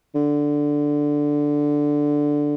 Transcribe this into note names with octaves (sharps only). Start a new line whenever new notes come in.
D3